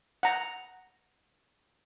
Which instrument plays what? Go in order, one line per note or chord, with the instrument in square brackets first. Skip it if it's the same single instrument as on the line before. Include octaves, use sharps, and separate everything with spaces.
[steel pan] F#5 A#5